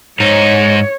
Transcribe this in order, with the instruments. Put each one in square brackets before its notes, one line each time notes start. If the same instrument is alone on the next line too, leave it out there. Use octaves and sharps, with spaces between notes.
[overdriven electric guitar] G#2 D#4 [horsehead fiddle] C#5